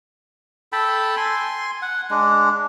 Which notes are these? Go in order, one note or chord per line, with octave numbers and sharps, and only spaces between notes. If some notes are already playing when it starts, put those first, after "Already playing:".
A4 G5 A5 B5
G#5 C6
F#5
G#3 D4